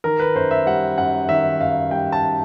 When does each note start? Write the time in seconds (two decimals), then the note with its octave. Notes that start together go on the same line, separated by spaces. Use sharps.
0.04 D#3 A#4
0.19 B4
0.35 F#2 C5
0.51 E5
0.66 G3 F#5
0.98 F#2 F#5
1.28 D#3 E5
1.60 F#2 F5
1.91 G3 G5
2.12 A5